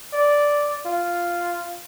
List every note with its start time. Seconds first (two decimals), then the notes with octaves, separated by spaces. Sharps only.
0.13 D5
0.85 F4